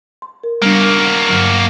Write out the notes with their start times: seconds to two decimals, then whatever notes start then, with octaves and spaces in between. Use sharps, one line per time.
0.22 C6
0.44 A#4
0.62 G3 A#3 B3 D4 F#4
1.28 G2 D3 F#3